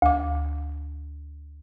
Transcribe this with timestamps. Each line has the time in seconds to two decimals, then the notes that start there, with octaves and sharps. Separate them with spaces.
0.02 D2 D6